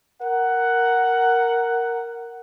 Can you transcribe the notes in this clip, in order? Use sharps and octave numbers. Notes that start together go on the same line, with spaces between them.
A#4 F#5